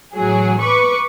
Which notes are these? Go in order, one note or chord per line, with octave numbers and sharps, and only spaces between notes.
A1 F#3 G#4
B4 C#6 D6